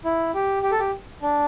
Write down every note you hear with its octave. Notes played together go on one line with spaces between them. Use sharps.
E4
G4
G4
A4
G4
D4